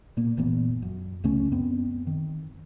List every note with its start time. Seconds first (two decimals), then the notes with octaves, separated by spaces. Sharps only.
0.17 A#2 A#3
0.37 F#1 A#2 E3 B3
0.82 F#2
1.24 C#2 C#3 A3 C#4
1.51 F#2 B3 C4
2.07 D#3